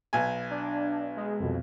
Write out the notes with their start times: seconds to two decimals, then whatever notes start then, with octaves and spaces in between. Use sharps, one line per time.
0.13 B1 G#5
0.50 D4
1.17 G#3
1.38 C2 F2 B2